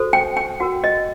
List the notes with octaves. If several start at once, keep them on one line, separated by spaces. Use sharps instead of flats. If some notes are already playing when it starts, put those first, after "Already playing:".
Already playing: F#4 A4 C5
G5
G5
F#4 A#4 F#5
D#5